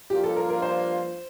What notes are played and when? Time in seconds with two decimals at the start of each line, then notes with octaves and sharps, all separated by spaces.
0.10 G2 F3 A#3 D4 F4 G4
0.24 A4
0.36 A#4
0.50 A#4
0.62 C5